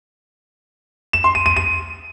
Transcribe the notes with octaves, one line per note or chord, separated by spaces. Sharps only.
E7
C6
D#7
D#7
D#7